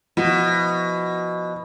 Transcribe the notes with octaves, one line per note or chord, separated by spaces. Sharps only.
B2 F3 E4 F#4